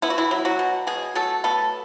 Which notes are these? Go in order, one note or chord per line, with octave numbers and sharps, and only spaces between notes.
B3 E4
F#4
E3 E4
F#3
F#3 F#4
B2
B2 G#3 G#4
F#3 A3 A4
A3 B3 A4